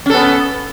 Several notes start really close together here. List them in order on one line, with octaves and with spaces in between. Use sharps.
C#4 A4 B3